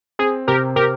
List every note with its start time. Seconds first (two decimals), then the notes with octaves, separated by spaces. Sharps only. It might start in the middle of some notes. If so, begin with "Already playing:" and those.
0.19 C4 G#4
0.48 C3 G4 A#4
0.76 C3 G4 A#4